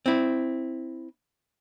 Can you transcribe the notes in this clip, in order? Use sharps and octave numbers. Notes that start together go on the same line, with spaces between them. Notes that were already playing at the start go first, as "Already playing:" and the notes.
C4 E4